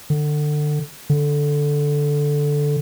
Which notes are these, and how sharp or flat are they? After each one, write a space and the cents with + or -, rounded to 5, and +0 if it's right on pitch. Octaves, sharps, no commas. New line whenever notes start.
D3 +25
D3 -5